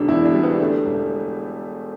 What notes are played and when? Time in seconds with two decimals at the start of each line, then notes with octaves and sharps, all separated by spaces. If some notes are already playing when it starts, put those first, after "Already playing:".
Already playing: E1 D3 D4
0.08 E2 E4
0.26 D4
0.34 G3
0.43 B3
0.60 D3 A3
0.86 E1